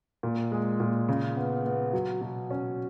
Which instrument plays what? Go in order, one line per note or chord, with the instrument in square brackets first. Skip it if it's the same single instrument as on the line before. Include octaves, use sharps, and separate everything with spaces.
[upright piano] A#2
G#3
A#2
C#3
B3
B3
F#3
B2
C#4